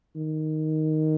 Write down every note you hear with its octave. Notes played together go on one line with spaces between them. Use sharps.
D#3